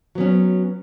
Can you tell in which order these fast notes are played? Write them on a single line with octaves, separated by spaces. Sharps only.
F#3 B3 C#4